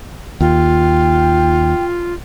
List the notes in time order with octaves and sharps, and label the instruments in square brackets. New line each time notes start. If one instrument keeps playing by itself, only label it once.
[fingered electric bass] D#2 [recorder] F4 [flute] G5